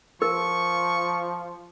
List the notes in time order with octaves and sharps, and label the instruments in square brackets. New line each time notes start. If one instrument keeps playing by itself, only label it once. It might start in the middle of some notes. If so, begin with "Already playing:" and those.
[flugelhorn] F3 [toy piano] A#4 [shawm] C#6